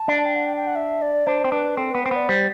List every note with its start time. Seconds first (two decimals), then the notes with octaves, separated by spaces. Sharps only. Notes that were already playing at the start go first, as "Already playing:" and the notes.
Already playing: A5
0.08 D4
0.25 G5
0.35 F#5
0.46 G5
0.57 G5
0.67 F#5
0.76 E5
1.02 D5
1.27 D4 C5
1.44 C4
1.52 D4 B4
1.77 C4 A4
1.91 B3 B4
2.03 C4 C5
2.11 B3 D5
2.29 G3 C5